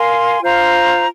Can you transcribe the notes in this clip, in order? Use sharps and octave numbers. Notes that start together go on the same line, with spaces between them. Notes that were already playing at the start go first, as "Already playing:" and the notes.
Already playing: A#4 F5 G#5 C6
F4 C5 F5 A#5